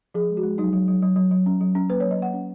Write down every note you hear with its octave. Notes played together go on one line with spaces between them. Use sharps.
F3 G#4
G#3
F#4
G#3
F#3 D#4
F#3
F#3
F#3
F#3
F#3
C#4
F#3
C#4
A#3 B4
F#3 C#5
D#5
A#3 F#5
C#4